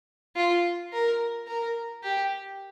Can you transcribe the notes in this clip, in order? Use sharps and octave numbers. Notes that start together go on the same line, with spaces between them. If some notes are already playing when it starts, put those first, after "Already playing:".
F4
A#4
A#4
G4